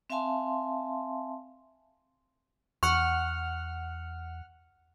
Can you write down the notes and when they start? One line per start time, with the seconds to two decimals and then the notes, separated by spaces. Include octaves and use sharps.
0.10 C4 E5 F5 G#5 A5 C6
2.83 E2 F#5 C#6 F6